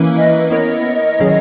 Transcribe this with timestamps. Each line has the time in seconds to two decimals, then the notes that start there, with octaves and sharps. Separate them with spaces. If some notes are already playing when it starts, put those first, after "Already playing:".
Already playing: E3 A#3 C#4 E4 B4
0.16 D#5
0.50 B3 E4 A#4 C#5 D#5
1.20 D#3 F#3 C#4 G#4 C#5